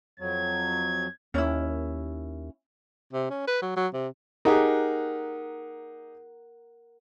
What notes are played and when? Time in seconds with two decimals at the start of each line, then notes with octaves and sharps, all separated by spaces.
0.20 F2 F#3 G#6
1.34 D#2 C#4 E4
3.13 C3
3.30 C#4
3.47 B4
3.62 F#3
3.76 F#3
3.94 C3
4.45 D#4 G4 G#4 A#4 F#5